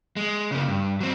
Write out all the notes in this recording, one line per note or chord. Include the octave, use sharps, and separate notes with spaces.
G#3
C#3 A#3
G2
F#3 C4